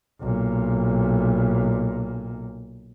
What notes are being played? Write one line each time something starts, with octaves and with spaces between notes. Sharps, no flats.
B1 A#2